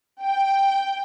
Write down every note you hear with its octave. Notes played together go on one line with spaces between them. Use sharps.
G5